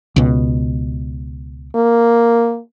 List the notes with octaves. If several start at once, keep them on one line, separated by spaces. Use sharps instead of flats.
C#2 B2
A#3